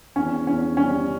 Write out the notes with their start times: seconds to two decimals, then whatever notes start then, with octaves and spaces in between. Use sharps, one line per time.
0.16 E2 C#4
0.47 E2 C#4
0.77 G3 C#4